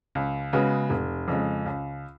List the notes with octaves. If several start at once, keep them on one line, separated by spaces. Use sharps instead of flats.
C#2
C#3 G#3 B3 F#4
F1
F2 C#3 G#3
C#2